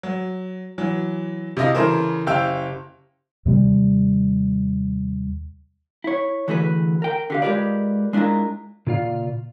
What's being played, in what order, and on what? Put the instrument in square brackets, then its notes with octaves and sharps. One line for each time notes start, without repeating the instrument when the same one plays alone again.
[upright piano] F#3
E3 F#3
C3 E4 D#5 F5 A#6
C#3 E3 E4 A4 A#4 C5
F#1 E4 G4 F5 G5 E6
[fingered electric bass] D#2 C3 G3
[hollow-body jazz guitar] E4 C#5
D3 E3 A3 F#4 G#4 B4
A#4 G5
D3 G4 F5
G#3 F4 G4 A#4 B4 D5
G#3 D4 E4 F4 A#4
[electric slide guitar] A#2 C#3 F4 D5 F5